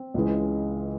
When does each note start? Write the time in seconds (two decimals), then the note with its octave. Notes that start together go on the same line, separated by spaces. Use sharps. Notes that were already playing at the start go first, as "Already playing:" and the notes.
Already playing: C4
0.14 C#2 C#3 E3 G#3